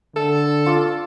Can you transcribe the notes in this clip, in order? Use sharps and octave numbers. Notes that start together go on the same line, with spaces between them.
D3 A4
F4 D6